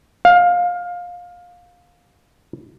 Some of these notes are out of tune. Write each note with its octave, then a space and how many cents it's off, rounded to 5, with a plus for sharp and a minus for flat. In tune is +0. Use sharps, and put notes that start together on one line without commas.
F5 +20